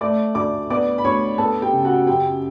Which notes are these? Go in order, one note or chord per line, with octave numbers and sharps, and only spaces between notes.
A3 D5 D6
D2 D5 D6
B3 D5 D6
B5
D2 C#5 C#6
B3 A4 A5
G4 G5
C#3
F#4 F#5
F#2 G4 G5